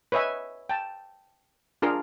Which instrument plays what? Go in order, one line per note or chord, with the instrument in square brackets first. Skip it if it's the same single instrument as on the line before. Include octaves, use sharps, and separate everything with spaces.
[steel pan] B4 C#5 D#5 E5 G#5
G5 A5
D4 F4 G#4 A#4